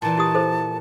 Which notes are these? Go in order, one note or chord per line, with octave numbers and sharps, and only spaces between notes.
A#2 E3 A5
E4 G4 D#6
A4 C5